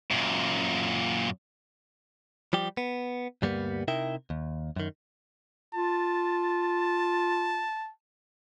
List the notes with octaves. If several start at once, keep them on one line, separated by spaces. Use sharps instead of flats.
F#2 A#2
F3 G3 G4
B3
D2 G2 G3 A#3 B3 G4
C3 D#4 E4 A#4 E5 G5
D#2
F#2 D#3
F4 A5